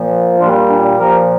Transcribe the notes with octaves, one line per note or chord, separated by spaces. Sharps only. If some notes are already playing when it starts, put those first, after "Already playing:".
Already playing: A#2 F3
A#2 G3 D4 F4
D4
A#2 F3 G4 A#4